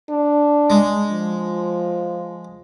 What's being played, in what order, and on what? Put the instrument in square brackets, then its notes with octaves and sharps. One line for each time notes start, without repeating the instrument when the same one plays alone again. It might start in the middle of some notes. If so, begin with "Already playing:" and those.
[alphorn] D4
[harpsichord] G#3
[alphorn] F3